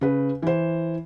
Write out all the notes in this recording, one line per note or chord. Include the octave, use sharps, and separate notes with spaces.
C#3 B4
E3 C5